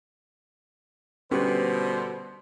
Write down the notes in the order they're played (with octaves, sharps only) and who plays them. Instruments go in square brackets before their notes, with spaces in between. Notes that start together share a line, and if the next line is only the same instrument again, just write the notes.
[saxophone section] B2 D3 [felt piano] G3 B3 C#4 [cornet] C5